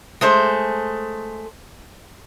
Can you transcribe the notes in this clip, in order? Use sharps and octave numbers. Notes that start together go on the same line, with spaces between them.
G#3 A3 C5